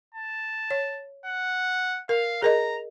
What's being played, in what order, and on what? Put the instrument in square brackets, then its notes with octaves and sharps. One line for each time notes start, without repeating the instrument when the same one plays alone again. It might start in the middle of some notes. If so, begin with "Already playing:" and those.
[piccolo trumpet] A5
[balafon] C#5
[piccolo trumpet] F#5
[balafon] A#4 [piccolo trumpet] F5
[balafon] G#4 A#4 D#5 [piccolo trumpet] A#5